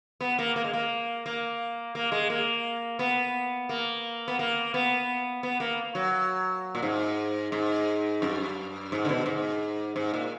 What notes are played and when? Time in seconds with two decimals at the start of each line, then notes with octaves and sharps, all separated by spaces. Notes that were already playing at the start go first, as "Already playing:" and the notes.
0.21 B3
0.39 A#3
0.56 A#3
0.64 G#3
0.73 A#3
1.26 A#3
1.95 A#3
2.12 G#3
2.30 A#3
2.99 B3
3.69 A#3
4.28 B3
4.39 A#3
4.74 B3
5.43 B3
5.60 A#3
5.95 F#3
6.75 A#2
6.82 G#2
7.52 G#2
8.22 F#2
8.92 G#2
9.05 D3
9.09 B2
9.26 G#2
9.96 G#2
10.14 A#2